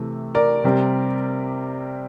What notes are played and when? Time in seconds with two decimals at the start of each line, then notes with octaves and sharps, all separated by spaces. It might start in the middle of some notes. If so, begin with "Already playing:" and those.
Already playing: C3 E3 A3
0.35 A#4 D5
0.64 C3 G3 C4